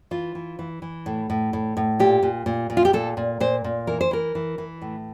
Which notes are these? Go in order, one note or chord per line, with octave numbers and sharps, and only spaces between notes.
E3 F4
E3
E3
E3
A2
A2
A2
A2
A#2 G4
A#2
A#2
A#2
F4
G4
A#2 A4
A#2
A#2 C5
A#2
E3 A#4
C5
E3 A#4
E3
E3
A2